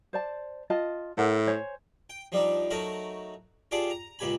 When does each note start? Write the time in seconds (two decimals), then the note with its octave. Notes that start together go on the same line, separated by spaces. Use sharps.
0.13 C5 D5 A5
0.70 F4 D#5 A5
1.17 A2 A4 A#4 F#5
1.47 C5 C#5 G#5
2.10 G5
2.32 F3 G3 D4 D#4
2.71 F#3 A3 D#4 F#4 A#4
3.71 F4 G4 G#4 D5 A5
3.90 A#5
4.19 C#2 A#2 G4 G#5 B5